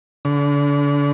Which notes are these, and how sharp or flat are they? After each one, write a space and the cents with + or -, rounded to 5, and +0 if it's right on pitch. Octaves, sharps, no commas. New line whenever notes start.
D3 -35